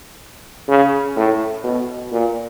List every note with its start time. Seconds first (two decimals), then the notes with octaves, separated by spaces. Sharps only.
0.69 C#3
1.16 A2
1.63 B2
2.11 A#2